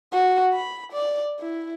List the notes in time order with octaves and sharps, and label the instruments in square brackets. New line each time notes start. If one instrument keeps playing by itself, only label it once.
[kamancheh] F#4
B5
D5
E4